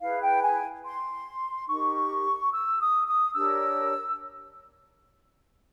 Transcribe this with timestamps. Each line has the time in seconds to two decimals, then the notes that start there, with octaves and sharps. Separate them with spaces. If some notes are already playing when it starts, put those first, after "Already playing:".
0.01 E4 G#4 B4 F5
0.22 G5
0.43 G#5
0.85 C6
1.68 D#4 G4 A#4 C#6
2.52 E6
2.80 D#6
3.07 D#6
3.35 D4 G4 A#4 C#5 E6